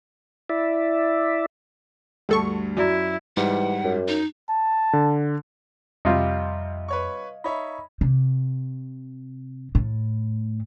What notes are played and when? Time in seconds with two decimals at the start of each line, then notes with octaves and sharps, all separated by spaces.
0.49 E4 D5 E5
2.29 D2 G2 G#3 A4 C#6
2.77 F#2 E4 F#4 D5 A#5
3.37 G#2 E3 G3 F#5
3.84 F#2
4.08 D#4
4.49 A5
4.93 D3
6.05 F2 C3 G3 F4 D#5 F5
6.88 B4 C#5 C#6
7.44 D#4 C#5 E5 B5
8.01 C3
9.75 A2